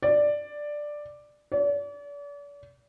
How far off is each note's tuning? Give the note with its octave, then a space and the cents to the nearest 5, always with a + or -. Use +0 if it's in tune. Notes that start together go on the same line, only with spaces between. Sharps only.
D5 +5
D5 -40